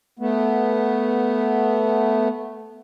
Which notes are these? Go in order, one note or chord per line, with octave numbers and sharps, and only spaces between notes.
A3 B3